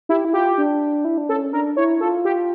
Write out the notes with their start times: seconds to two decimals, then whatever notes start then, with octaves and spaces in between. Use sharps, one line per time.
0.09 E4 G4
0.25 E4
0.33 F4 G4
0.58 D4
1.05 E4
1.18 D4
1.29 C#4 A4
1.53 D4 A#4
1.77 E4 C#5
2.01 F4 A4
2.25 G4